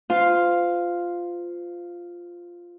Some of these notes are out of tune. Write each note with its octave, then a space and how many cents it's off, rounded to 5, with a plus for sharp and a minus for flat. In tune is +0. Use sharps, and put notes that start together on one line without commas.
F4 +0 C5 -30 F5 +0